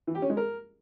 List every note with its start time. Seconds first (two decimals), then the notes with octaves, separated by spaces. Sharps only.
0.07 E3
0.15 G4
0.22 C#4
0.30 G#3
0.37 A#4